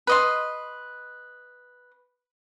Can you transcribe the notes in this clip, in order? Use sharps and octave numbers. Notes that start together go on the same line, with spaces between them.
B4 D#5 C6